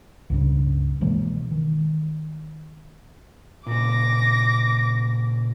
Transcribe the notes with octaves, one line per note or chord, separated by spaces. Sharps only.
C#2 G2 C#3
B2 E3 G#3 A#3
D#3
A#2 C#3 D6 A#6